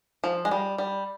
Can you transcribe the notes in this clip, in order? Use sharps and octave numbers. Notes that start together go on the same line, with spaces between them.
F3
G#3
G3
G3